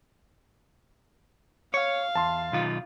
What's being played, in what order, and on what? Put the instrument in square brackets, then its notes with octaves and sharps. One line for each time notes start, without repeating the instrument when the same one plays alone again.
[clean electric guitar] C#5 [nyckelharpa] F5
[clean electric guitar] E2 [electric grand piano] A5 C6
[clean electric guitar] B1 D#3 F4